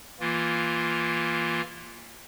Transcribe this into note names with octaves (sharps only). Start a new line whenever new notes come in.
E3 A#3 F4